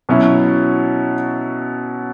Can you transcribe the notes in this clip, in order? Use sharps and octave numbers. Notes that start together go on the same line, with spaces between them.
B2 F#3 C#4 E4